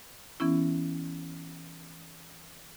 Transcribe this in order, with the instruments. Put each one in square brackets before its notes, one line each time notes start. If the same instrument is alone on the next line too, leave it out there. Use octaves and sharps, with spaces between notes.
[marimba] E3 B3 C#4 E4